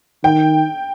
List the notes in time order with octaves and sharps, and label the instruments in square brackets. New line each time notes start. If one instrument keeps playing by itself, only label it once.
[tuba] D#3 [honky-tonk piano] G5